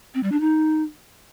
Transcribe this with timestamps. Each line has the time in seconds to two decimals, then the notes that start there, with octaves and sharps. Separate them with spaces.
0.14 C4
0.23 G3
0.32 D4
0.40 D#4